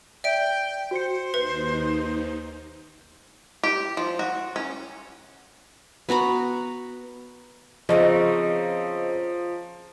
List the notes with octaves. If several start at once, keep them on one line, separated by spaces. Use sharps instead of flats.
D5 E5 G5 D7
F#4 C5 C#7
D#2 D#3 B4
G4
F3
F#4
C#4
B3 F#4 A#5 B5
C#3 F3 C4 D#4 D#5